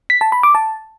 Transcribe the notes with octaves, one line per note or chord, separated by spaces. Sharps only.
B6
A5
B5
D6
A5